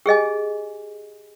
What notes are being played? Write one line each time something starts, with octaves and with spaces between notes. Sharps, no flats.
G4 G#4 D#5 G#5